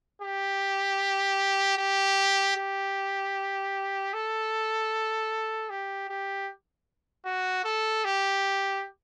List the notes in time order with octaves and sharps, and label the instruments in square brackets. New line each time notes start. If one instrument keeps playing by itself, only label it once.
[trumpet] G4
G4
G4
A4
G4
G4
F#4
A4
G4